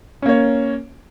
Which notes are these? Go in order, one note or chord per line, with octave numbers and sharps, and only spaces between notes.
A#3 C#4 C#5